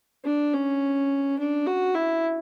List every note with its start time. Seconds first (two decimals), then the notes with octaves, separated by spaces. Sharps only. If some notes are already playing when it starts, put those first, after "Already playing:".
0.25 D4
0.54 C#4
1.39 D4
1.66 F#4
1.95 E4